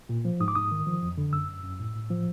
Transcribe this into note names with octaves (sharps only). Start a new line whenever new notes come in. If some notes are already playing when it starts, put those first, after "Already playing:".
A#2
F3
G#2 D#6
D6
G#2 D#6
D#3
F3
F2
D3
F#2 E6
F#2
F#2
A2
A2
F3